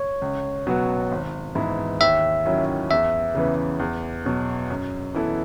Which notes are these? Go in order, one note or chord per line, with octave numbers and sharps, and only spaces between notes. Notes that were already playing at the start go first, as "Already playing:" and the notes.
Already playing: C#5
C#2
B2 F#3 B3 F#4
G#1
G#2 E3 B3 E4
D#2 E5
D#3 F#3 C#4 E4
E2 E5
C#3 E3 B3
E2
B2 F#3
F#2
E3 B3 E4 A4